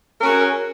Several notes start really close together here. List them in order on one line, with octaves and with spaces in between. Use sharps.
A#4 C#4 F#4 G#4